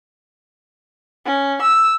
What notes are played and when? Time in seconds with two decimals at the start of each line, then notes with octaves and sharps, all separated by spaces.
1.26 C#4
1.61 E6